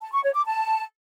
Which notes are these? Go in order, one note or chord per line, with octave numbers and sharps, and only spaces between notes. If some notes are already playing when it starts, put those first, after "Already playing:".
A5
C#6
C#5
D6
A5